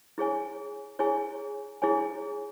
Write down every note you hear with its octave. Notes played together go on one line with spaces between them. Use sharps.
E4 G#4 C#5 G#5
E4 G#4 C#5 G#5
E4 G#4 C#5 G#5